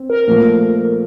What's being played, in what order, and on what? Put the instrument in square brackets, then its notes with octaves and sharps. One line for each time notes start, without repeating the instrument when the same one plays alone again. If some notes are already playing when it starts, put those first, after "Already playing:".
Already playing: [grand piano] C4
[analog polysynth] A#4
[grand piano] A#2 F3 A3